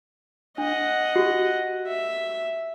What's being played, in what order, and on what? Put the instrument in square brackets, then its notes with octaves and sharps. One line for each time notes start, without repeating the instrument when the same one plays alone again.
[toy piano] D4 [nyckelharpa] D#5 F#5
[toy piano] F#4 G4
[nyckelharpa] E5